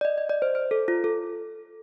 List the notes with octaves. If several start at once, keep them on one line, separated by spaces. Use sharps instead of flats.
D5
D#5
D#5
D5
C5
C5
A4
F4
A4